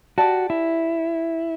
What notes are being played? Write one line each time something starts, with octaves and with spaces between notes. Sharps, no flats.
F#4 G4 D5 A5
E4